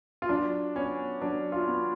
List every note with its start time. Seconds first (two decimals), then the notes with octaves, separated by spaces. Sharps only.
0.22 F4
0.29 F#3 D4
0.75 B3 C#4
1.22 F#3 D4
1.52 F4
1.68 B3